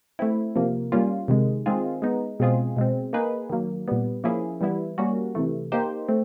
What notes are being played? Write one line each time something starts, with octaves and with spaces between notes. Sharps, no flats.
A3 C4 E4
C3 F3 A#3
G3 A#3 C#4 F4
C3 D#3 G#3
D#3 G#3 C4 F4 G#4
G#3 B3 D#4
B2 G#3 C4 F4 G#4
B2 G#3 C4
A#3 D#4 G#4 B4
D#3 F#3 A#3
A#2 G3 B3
F3 A#3 C#4 E4 G#4
E3 G3 B3 E4
G3 A#3 C#4 F#4
C3 E3 A3
A#3 D#4 G4 C5
A3 C4